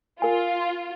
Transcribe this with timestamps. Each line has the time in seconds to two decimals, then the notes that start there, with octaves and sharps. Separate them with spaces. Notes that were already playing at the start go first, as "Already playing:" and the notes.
0.22 F4 A#4 G#5